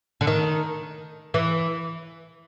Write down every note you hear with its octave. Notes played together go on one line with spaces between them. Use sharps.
D3
D#3
E3